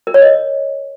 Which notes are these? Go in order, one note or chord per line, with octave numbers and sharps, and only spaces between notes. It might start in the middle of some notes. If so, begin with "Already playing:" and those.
A#4
C#5
D#5